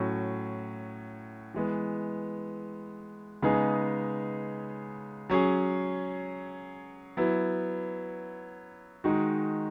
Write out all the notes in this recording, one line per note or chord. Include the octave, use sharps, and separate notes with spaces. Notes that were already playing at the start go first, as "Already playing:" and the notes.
Already playing: A2 F#3 C#4 F#4
E3 G#3 B3
C#3 G#3 B3 D#4 G#4
F#3 C#4 G#4
F#3 B3 E4
D#3 G#3 D#4 F#4